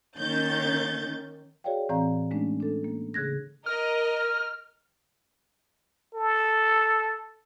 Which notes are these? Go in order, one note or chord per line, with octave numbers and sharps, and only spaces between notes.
D#3 A#3 C#4 G6 A6
F#4 G#4 C#5 D5 F5 G5
A2 E3 C4 D5 F5 A#5
G#3 A3 C#4 D4
D4 A4
A#3
C#3 G#4 F#6 G#6 A#6
A#4 D#5 F6
A4